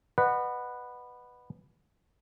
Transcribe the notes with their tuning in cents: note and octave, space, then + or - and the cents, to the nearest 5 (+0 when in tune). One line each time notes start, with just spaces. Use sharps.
B4 +0 D#5 -35 F#5 +0